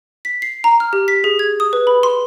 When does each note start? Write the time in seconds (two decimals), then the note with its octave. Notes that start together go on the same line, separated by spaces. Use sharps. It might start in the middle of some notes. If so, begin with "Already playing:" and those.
0.25 B6
0.42 C7
0.64 A#5
0.80 F6
0.93 G4
1.08 B6
1.24 G#4
1.39 G#6
1.60 D#6
1.73 B4
1.87 B5
2.03 C6